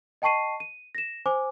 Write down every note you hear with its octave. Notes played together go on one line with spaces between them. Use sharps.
D#5 G5 A5 C#6 C7 D#7
D#7
A#6 E7
C5 G#5 D6